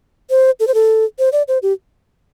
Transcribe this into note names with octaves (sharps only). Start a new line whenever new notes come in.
C5
A4
C5
A4
C5
D5
C5
G4